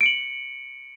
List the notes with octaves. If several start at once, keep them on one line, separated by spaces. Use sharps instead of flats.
C#7 D7 F#7